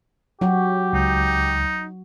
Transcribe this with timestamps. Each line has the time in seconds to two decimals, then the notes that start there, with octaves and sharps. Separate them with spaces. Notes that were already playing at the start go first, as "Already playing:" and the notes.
0.41 F#3 F#4 G4
0.93 C#2 D#4